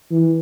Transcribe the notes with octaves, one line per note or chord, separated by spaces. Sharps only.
E3